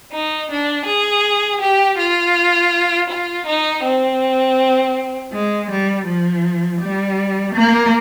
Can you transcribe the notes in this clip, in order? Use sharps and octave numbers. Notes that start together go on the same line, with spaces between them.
D#4
D4
G#4
G4
F4
F4
D#4
C4
G#3
G3
F3
G3
A#3